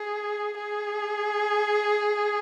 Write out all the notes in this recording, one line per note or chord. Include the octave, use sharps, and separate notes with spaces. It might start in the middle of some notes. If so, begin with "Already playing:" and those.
Already playing: G#4
G#4